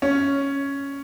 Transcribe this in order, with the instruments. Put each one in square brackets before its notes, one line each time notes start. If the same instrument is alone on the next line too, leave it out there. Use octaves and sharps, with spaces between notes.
[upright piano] C#4